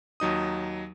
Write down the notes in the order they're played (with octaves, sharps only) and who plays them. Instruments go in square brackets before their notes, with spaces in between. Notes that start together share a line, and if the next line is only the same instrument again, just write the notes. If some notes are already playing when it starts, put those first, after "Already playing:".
[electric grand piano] D#2 F#3 D#4 D#6